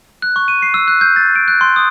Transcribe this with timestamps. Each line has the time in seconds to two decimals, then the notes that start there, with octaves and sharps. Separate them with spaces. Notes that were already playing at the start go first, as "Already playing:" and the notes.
0.22 F#6
0.36 C#6
0.48 D#7
0.62 C7
0.74 E6
0.88 F#6
1.01 G6
1.16 A6
1.36 D7
1.48 F#6
1.61 C6
1.76 D#6